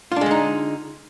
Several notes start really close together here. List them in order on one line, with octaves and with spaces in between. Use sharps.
F4 D4 G#3 D3 D#4